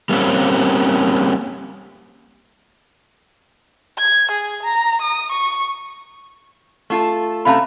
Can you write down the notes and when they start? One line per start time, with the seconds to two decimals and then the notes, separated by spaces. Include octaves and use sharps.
0.09 G3 A#3 C4 C#4
3.99 G#6
4.32 G#4
4.63 A#5
5.02 D#6
5.32 C#6
6.90 A3 F4 A4
7.45 C3 A3 C#4 F5 A#5 B5